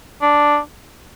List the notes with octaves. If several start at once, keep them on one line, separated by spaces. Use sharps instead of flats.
D4